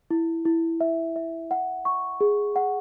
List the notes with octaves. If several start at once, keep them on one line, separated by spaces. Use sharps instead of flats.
E4
E4
E5
E5
F#5
C#6
G#4
F#5